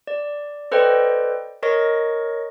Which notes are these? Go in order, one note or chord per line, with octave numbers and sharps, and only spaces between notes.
D5
A4 B4 C5 D5 D#5 G5
A#4 C#5 D#5 C#6 A#6